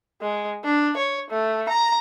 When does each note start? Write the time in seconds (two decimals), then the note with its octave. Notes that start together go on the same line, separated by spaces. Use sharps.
0.22 G#3
0.64 D4
0.97 C#5
1.31 A3
1.69 A#5